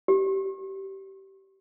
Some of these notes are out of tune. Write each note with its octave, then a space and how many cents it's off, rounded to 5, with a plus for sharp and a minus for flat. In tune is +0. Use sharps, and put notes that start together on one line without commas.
G4 -20